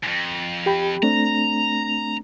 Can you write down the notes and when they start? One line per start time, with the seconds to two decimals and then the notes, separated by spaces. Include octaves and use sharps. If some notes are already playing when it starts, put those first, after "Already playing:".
0.03 F2 G#2
0.66 G4 G5 B5
1.03 A3 C4 D4 A#5